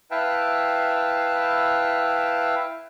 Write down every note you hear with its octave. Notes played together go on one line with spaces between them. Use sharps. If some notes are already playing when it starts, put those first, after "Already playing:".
E4 B4 E5 F5 G5 A5